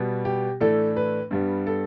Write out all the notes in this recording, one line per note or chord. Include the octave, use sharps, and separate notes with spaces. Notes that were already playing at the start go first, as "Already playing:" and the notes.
Already playing: B2 G3 B3
G4
A2 E3 A3 D4 A4
B4
G2 G3 B3
A4